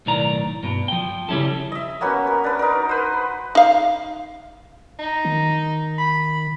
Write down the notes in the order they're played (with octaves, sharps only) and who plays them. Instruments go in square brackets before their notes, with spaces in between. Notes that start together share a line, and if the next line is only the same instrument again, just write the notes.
[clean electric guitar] B1 A2 D#3 D5 A#5
G2 B2
F3 G5
C#3 G3 C#4 E4 A4
[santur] D#5 E5
A#3 B3 C#4 F#4
A#4
D4 B4
D#4 A#4
B4 C5
[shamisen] D#4 F5
[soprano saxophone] D#4
[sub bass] D#3
[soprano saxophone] B5